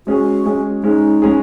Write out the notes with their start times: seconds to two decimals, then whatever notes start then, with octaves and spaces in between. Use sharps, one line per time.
0.07 G#3 C#4 F#4 G#4
0.46 G#3 C#4 G#4
0.83 G#3 C#4 D#4 G#4
1.22 G#3 C#4 G#4